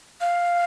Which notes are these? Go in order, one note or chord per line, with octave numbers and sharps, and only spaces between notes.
F5